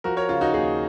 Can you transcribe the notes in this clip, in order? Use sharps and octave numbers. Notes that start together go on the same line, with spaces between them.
F3 F#4 A#4
A#4 C#5
C#3 F4
D#4 F#4
D#2 F4 G#4